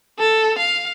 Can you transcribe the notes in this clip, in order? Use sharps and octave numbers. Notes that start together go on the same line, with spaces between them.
A4
F5